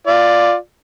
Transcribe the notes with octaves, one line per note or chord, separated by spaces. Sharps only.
F4 D5